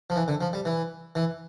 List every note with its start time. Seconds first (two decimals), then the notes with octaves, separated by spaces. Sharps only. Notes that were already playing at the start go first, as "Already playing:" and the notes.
0.10 F3
0.16 E3
0.28 D3
0.41 F3
0.53 G3
0.65 E3
1.15 E3